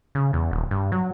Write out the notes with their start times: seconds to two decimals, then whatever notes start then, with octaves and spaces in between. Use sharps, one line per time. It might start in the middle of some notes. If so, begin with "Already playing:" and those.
0.15 C#3
0.33 E2
0.51 D#1
0.71 G2
0.92 F#3